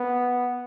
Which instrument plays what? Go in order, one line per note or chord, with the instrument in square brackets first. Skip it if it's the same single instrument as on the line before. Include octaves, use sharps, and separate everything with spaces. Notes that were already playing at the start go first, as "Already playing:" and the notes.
Already playing: [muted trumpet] B3